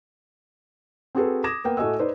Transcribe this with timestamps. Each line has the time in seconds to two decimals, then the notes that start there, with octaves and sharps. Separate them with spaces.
1.15 C4 F#4 G#4 A4 B4
1.44 D6 D#6 G#6 A#6 E7
1.64 A#3 B3 G5
1.77 A2 A3 F#4 D#5 G#5 E6
1.99 D#4 B4 C5 D5